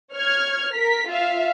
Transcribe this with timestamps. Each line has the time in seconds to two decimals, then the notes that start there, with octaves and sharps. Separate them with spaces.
0.14 C#5 F6 G#6
0.74 A#4 B6
1.07 F4 E5 F5